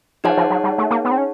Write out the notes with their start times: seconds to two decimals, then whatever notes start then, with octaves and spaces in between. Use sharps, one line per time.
0.24 F3 D#4 G#4 C#5 F#5 A5
0.37 F3
0.50 F#3
0.64 G3
0.78 A3
0.91 A#3
1.05 B3
1.11 C4
1.18 C#4